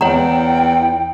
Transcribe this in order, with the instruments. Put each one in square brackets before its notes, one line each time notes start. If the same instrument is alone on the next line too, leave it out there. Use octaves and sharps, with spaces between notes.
[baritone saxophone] E2 [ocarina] E4 [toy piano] C#5 F#5 A#5 [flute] G5